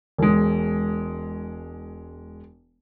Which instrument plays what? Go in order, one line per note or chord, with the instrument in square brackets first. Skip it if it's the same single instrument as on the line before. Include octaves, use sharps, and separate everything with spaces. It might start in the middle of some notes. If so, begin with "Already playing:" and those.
[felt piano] E1 G#3